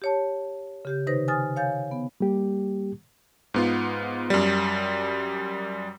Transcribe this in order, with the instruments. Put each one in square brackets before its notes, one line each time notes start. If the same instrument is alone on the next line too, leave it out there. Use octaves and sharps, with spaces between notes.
[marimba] G4 C#5 A5
C#3 G4 G6
C3 D#3 D#4 B4 C5 A#6
G#5 D#6 F6 A6
C#5 F5 G#5 G6 A6
B3
[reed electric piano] G3 A#3 G4
[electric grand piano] G#2 B3 F4
F#2 G3